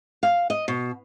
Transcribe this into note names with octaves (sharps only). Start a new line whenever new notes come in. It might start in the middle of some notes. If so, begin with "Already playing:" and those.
F5
D#5
B2